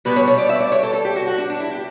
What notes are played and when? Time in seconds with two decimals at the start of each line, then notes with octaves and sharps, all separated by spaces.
0.05 B2 G3 B3 B4
0.16 C#5
0.28 C#5
0.38 D5
0.49 E5
0.60 D5
0.72 C#5
0.83 A4
0.94 A4
1.05 G4
1.16 F#4
1.27 F#4
1.38 D4
1.49 D4
1.60 E4
1.71 G4